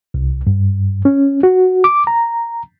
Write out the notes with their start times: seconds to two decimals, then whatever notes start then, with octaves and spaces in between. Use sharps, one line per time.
0.14 C2
0.47 G2
1.05 C#4
1.43 F#4
1.84 D6
2.07 A#5